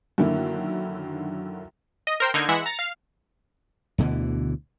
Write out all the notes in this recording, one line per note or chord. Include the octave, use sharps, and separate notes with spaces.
F#2 D3 D#3 A#3 E4
D#5
A#4 C5 G5
D3 A#3 D#4 G#6
E3 G#3 E5 F#5
A#5 A6 C#7
F5
D2 B2 D3 E3